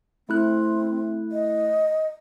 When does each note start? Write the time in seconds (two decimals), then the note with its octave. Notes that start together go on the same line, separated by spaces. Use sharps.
0.29 A3 C4 E4 F#6
1.32 D#5